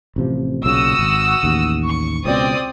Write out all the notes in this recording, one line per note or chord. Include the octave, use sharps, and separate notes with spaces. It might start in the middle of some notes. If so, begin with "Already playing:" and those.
A1 C3 F3
B1 A#2 C#3 F#4 D#6 E6
G#1
A1 D#2
C#6
C#2 B2 C4 D5 D#6